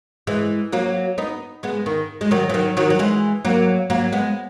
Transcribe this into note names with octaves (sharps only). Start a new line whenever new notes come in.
E3 G#3
F#3 A#3
B3 D#4
G#3 B3
D#3
G#3
D#3 F#3
E3
D#3 F#3
D#3 F#3
F#3
E3 G#3
F#3 A#3
F#3 A#3
G#3 B3